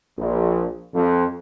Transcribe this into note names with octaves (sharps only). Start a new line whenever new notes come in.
A#1
F2